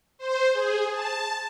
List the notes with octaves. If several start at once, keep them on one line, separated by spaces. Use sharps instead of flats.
C5
G#4
A5